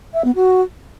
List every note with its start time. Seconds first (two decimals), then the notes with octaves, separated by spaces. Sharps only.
0.14 E5
0.24 B3
0.35 F#4